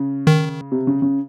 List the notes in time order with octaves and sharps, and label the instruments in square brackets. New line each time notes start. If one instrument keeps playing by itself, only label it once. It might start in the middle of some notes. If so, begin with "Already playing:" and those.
Already playing: [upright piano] C#3
[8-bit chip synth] D#3
[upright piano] C3
C#3
C#3